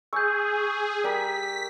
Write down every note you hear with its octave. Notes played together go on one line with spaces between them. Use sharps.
G#4 C#6 E6 G6
G3 G4 A#4 B6